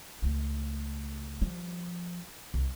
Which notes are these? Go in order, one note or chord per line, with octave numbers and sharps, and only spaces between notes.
C#2 A3
F3 G3
C2